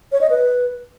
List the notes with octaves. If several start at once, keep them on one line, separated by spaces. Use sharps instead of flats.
C#5
D#5
B4